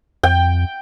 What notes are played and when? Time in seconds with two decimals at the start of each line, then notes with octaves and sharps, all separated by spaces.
0.23 F2 G5